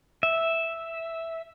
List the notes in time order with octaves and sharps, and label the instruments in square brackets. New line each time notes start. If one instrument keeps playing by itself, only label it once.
[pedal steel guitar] E5